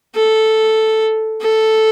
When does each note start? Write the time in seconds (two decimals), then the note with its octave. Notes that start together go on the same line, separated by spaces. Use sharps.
0.15 A4
1.41 A4